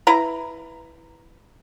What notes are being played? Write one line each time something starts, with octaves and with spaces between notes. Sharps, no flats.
E4 B4 A#5